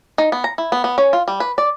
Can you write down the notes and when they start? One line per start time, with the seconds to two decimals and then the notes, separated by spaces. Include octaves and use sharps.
0.18 D#4
0.32 B3
0.44 A#5
0.58 E4
0.72 B3
0.84 B3
0.98 C#4
1.13 F4
1.28 G3
1.40 B4
1.58 D5